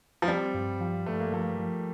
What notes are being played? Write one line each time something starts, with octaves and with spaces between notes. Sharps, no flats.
F3
G3 C4
G2
F3
G2 A3
A#3
F3 A3
F3